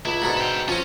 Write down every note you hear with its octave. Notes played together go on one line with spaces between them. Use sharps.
C#2 E4
G#2 B2 D3
E5 G5
F3 C4 C#4